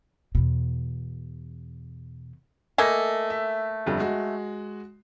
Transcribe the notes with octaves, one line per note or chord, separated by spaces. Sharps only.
E2 B2
A3 A#3 D#5 G#5 A#6
E5
G1 F2 G3
G#3 F#4